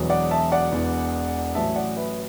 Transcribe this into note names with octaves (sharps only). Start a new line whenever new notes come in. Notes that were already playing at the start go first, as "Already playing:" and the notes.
Already playing: E1 E2 B2 F#3
D5 F#5
E5 A5
D5 F#5
E1 E2 E3
A1 A2 F#3 E5 A5
D5 F#5
B4 E5